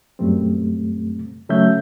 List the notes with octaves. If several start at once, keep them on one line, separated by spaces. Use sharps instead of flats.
F#2 A#2 G3 A3 C4
C#3 F#3 A3 C#4 E5 G6